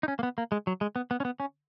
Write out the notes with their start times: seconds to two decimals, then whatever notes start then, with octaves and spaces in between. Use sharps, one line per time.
0.03 D#4
0.08 C#4
0.19 A#3
0.23 B3
0.38 A#3
0.52 G#3
0.67 F#3
0.81 G#3
0.96 B3
1.11 B3
1.20 C#4
1.25 B3
1.40 C#4